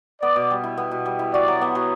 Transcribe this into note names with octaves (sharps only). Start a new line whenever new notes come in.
B3 D5
B2
G3
E4
B3
B2
G3
E4
F#4 D5
F#3
B3
F#3